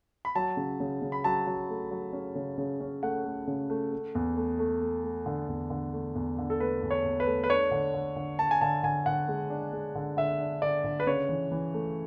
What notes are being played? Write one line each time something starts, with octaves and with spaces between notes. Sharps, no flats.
B5
F#3 A5
C#3
C#3
C#3
B5
F#3 A5
F#3
A3
F#3
C#4
C#3
C#3
C#4
A3 F#5
A3
C#3
A3
A3
E2
A3
A3
A3
A3
D3
E2
D3
A3
E2
D3
A4
A3 B4
E2
C#5
E2
B4
A3
B4
D4 C#5
D3
D3
D3
D3 A5
G#5
D3 A5
D3 G#5
D3 F#5
G#3
D4
G#3
D3
D3 E5
D4
D3 D5
D3
B4
C#3 C#5
E3
E3
A3